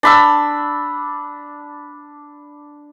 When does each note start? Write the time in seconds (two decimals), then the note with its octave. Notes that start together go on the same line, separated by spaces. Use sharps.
0.03 D4 B5 E6